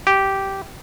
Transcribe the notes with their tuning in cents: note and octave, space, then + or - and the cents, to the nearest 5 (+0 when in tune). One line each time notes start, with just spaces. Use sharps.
G4 -10